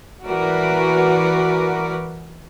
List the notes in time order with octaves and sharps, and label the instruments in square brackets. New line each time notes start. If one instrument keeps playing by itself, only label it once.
[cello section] E3 F#4 A#4 B4 D5